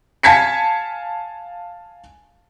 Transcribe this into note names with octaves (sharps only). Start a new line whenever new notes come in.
F5 G#5 A5 G#6 B6 C#7